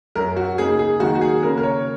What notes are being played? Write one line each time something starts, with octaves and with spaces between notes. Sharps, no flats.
F#2 F#3 C#4 A#4
F#4
C#3 A#3 D#4 G#4
G#4
D#3 F#3 A#3 D#4 F#4
F#4
G#4
C#3 A#3 C#4 A#4
A#4
C#5